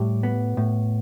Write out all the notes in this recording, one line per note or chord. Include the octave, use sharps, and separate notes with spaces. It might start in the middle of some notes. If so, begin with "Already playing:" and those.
Already playing: A2 G3 G4
B3
A2